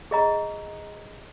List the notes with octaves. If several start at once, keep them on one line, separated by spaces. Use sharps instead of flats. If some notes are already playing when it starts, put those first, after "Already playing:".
G#4 D#5 A#5